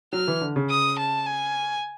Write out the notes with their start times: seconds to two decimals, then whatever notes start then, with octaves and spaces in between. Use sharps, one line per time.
0.13 F#3 F6
0.28 E3
0.41 D3
0.56 C#3
0.70 D#6
0.99 A5
1.26 G#5